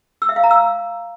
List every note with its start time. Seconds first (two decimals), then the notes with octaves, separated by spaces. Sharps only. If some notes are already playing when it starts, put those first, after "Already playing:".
0.22 E6
0.29 E5
0.36 F5
0.43 A#5
0.51 E6